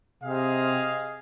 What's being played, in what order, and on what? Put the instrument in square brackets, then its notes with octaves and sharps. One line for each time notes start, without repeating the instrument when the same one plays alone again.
[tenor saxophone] C3 [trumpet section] G#4 D#5 F5